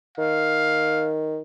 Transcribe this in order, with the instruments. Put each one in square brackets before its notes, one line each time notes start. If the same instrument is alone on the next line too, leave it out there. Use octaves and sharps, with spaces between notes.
[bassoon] D#3 [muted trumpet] F5